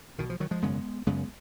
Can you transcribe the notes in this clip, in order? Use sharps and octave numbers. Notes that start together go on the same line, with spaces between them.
B1 B2 D#3
F3
D#3 F#3
F3 G#3
G#1 F#2 C#3 G#3 B3
F#1 F#2 C#3 G#3 B3